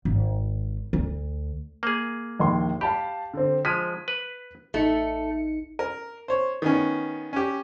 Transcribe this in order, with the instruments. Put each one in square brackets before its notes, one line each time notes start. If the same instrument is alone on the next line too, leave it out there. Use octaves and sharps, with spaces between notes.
[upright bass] G#1
D2
[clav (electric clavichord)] A#3 G#4
[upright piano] A#1 D#2 C6
[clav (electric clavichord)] G4 [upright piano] F5 A5 B5
[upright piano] D3 C4
[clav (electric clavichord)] F3 G#3 [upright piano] B6 D#7
[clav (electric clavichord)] B4
[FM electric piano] A1 D#4 C#7 [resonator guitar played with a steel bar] A3
[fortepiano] A#4
C5 C#5
D#3 B3 C#4
C#4 G4